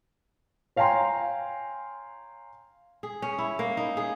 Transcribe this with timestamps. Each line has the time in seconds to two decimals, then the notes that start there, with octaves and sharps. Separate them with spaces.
0.76 C#5 F5 G5 G#5 A#5 C6
3.03 G#4
3.22 C#4
3.38 E4
3.59 A#3
3.77 D#4
3.97 G#4